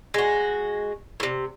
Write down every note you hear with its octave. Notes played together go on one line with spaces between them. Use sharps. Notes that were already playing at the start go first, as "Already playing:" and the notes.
G#3 F#4
A2 C3